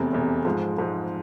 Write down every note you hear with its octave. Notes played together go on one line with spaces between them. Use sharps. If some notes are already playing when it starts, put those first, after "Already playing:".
Already playing: F1 E2 C3
F1 E2 C3
G#2 F3 G#3
G#2 F3 G#3